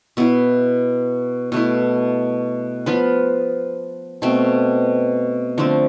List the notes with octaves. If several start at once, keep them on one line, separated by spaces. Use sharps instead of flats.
B2 B3 E4
B2 A3 E4
F3 B3 F4 B4
B2 A3 C4
D3 F3 A3 C4